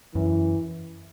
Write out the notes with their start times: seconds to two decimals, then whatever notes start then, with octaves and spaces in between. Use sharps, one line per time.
0.15 F#2 E3